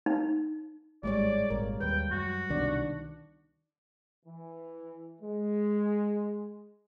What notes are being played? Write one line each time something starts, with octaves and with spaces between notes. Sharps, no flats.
D#4
G#1 A2 G3 G#3 C#5 D5
G#1 A#2 A#4
D#2 G3 B4 G5
F#2 F#4
C2 B2 D#3 D4 D5
E3
G#3